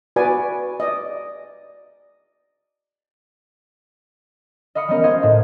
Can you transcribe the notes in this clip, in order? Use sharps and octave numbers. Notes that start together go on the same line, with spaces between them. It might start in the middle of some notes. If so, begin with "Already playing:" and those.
F#4 B4 D5 G#5
D5 D#5
D#5 F5 B5 D#6 C#7
G3 G#3 B3 C#4 A#4 D#5
C5 D#5 F5 C6 G#6 A#6
A2